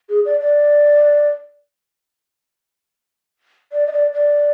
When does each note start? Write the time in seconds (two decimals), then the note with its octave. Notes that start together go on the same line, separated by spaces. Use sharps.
0.09 G#4
0.25 D5
0.41 D5
3.72 D5
3.87 D#5
3.92 D5
4.14 D5